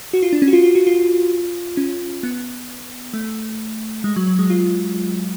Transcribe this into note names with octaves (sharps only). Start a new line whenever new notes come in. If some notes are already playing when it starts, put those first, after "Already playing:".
F#4
F4
D4
C#4
F#4
F4
F4
F#4
F4
C#4
B3
A3
G#3
F#3
F#3
G#3
F4